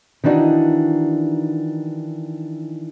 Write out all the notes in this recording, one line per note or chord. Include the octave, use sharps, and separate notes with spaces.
D#3 E3 D4 D#4 F#4